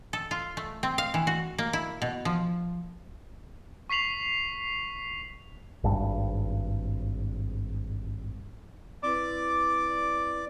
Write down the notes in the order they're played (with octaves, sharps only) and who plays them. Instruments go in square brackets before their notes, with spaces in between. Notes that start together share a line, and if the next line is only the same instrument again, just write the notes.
[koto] A4
F4
A3
C4
F5
E3
F#4
A#3
E4
B2
F3
[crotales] C#6 B6 C7 F7 F#7
[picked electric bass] G#1 G2
[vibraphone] C4 E4 B4 [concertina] D5 D6